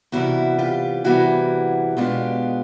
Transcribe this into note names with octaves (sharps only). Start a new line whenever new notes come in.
C3 E3 G3 B3 E4 F#4
F4 G4
C3 E3 G3 B3 E4 F#4
B2 G#3 B3 D4 F4 G4